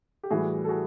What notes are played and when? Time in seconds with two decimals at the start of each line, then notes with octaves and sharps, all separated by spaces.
0.23 G4
0.30 A2 E3 G3 F#4 G#4
0.64 A4
0.69 F#4 G#4